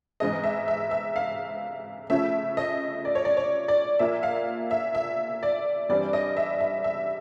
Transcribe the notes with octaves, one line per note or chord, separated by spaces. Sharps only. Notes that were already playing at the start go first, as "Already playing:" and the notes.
G#2 E3 G#3 C4 D#5
E5
E5
E5
F5
C#3 F3 A3 C#4 E5
D#5
D5
C#5
D5
C#5
D5
A#2 F3 A#3 E5
F5
E5
E5
D5
G2 E3 G3 C4 D5
D#5
E5
E5
E5